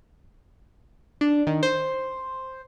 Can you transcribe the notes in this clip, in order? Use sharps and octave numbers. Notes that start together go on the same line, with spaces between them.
D4
D#3
C5